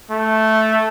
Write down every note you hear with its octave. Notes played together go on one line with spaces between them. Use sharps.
A3